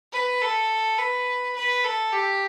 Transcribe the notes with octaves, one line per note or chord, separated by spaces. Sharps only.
B4
A4
B4
B4
A4
G4